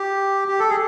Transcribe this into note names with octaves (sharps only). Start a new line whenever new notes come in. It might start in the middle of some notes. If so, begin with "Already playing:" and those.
Already playing: G4
G4
A4
G#4